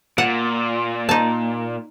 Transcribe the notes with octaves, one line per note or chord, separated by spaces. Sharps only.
A#2 F#5
D#4 A5